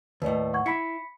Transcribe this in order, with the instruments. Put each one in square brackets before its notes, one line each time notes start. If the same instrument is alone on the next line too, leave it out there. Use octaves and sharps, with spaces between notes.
[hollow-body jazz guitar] D#2 A2 [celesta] B4 D5 D#5
[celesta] F#5 C#6 G#6
[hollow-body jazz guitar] E4 [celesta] B5 B6 C#7